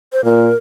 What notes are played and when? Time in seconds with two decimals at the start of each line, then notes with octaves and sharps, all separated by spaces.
0.13 C5
0.24 A#2 A#4